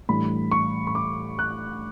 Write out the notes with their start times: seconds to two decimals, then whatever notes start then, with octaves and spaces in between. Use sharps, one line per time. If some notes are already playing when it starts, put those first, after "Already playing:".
0.09 A2 E3 G3 D4 B5
0.52 C#6
0.87 C#6
0.95 D6
1.39 F#6